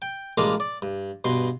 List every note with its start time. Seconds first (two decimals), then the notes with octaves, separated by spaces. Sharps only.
0.02 G5
0.38 A1 G#3 A#3 D4 A#4 F5
0.60 D5
0.82 G2
1.24 G2 B2 C6